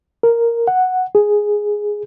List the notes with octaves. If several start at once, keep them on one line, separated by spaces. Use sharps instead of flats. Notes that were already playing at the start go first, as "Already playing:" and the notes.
A#4
F#5
G#4